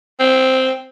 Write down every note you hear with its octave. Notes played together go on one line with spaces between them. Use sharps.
C4